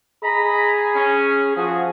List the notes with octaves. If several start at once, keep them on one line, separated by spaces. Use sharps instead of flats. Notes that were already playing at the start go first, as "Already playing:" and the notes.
G#4 D#5 A#5 B5
C#4
F3 F#4 G#4